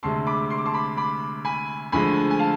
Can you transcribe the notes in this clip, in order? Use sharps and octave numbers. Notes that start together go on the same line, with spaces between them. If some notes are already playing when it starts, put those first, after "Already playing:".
D2 C3 G#3 A5 C6
B5 D6
C6
D6
A5 C6
B5 D6
B5 D6
G#5 B5
D2 D3 F3 G#3 G#5 B5
G#5
F5 A5